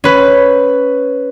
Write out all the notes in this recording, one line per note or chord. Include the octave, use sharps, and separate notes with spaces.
C#4 B4